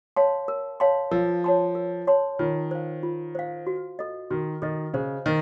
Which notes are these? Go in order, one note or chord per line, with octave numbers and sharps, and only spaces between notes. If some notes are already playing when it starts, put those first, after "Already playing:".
C#5 F5 A5 C6
A#4
C#5 F5 A5 C6
F3 A#4
C#5 A5 C6
A#4
C#5 A5 C6
D#3 F4
C5 F5
F4
C5 F5
F#4
A4 D#5
D#3 F#4
D#3 A4 D#5
C#3 C5
D#3 D#5